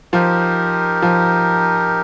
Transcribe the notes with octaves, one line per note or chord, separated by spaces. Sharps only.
F3 D#4 G4 A#4
F3